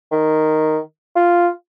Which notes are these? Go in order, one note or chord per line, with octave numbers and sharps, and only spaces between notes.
D#3
F4